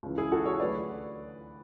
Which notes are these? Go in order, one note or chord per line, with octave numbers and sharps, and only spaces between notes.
C#2 C#3 E3
E4 G#4
F#4 A4
A4 C#5
D2 D3 F#3 B4 D5